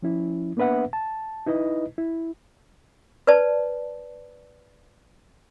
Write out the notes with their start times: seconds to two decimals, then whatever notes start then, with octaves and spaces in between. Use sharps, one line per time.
0.02 F3 C#4 E4
0.57 A#3 B3 D4 B4 E5 F#5
0.93 A5
1.46 D#4 E4 B4 D#5
1.98 E4
3.27 B4 C5 D5 A5